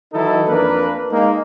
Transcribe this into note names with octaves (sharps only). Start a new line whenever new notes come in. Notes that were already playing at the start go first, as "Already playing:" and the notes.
D#3 E3 F#3 D#4 E4 A4
F2 A#3 D4 A#4 B4
G#3 A#3 D#4